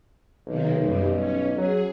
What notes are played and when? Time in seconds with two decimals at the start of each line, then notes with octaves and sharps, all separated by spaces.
0.47 B1 C3 D#3 A#3
0.81 F#2 G3
1.16 C#4
1.57 F#3 G#4